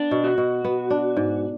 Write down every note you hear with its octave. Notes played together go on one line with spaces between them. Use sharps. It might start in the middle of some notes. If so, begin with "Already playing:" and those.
Already playing: B3 D4
B2
F#4
B2
B3
D4
G#2